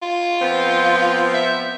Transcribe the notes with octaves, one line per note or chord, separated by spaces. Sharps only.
F4
F3 B3 C4
E5